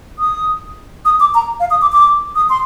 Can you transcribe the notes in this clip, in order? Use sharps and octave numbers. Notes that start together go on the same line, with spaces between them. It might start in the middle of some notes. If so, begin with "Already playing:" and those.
D#6
D#6
D6
A#5
F5
D#6
D6
D6
D#6
C6